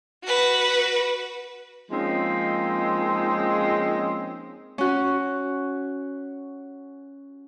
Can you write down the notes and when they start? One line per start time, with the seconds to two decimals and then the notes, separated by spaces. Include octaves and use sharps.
0.25 F#4 B4
1.90 F3 G#3 A#3 C4 C#4 D#4
4.78 C#4 F#4